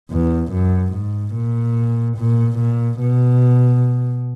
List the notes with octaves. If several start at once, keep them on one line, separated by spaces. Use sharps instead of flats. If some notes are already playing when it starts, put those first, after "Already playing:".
E2
F#2
G#2
A#2
A#2
A#2
B2